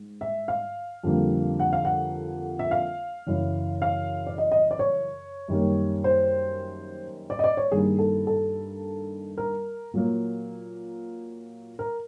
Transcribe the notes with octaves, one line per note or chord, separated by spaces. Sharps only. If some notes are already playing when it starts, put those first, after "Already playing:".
Already playing: G#2
E5
F5
F2 D3 G3 A#3
F#5
F5
F#5
E5
F5
F#2 C#3 E3
F5
D5
D#5
D#5
D5
C#5
F#2 D#3 G3 A#3
C5
D5
D#5
D5
C#5
G2 D#3 G3 A#3 G#4
A4
A4
A#4
A#2 F#3 A#3
A#4